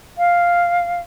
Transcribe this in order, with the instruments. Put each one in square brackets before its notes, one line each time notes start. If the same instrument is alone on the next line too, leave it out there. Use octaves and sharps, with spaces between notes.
[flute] F5